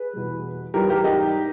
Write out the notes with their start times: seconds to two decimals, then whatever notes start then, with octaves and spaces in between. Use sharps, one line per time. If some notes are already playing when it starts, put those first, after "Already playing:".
Already playing: G#4 B4
0.13 E2 B2 G3
0.74 G#2 E3 G3 G4 A#4
0.89 G4 A#4
1.04 D#4 G4